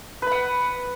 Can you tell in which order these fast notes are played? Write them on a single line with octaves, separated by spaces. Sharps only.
B4 B5 F#5